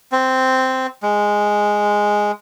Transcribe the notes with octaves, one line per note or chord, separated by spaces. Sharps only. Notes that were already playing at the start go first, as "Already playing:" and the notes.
C4
G#3